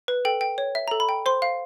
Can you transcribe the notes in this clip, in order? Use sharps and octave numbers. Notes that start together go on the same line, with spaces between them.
B4
A4 G5
G5
C#5
E5
A4 A#5
B5
G5
C5 C6
F5